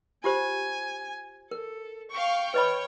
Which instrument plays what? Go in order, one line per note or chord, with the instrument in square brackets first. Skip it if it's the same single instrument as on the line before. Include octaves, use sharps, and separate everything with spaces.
[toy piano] F4 G4 C5 [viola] G#5
[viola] A4 [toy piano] A#4
[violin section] F5 C#6 [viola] G5
[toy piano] B4 D#5 B5 [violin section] C#5